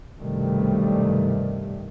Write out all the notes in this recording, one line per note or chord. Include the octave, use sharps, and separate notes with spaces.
B1 G2 C3 D#3 G3 A3